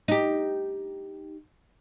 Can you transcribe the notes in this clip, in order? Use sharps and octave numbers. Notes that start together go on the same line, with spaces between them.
D#4 G4